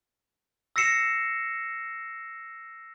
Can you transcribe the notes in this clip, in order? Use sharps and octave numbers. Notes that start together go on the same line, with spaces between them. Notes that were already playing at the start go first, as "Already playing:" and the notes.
E6 A#6 C7 C#7 E7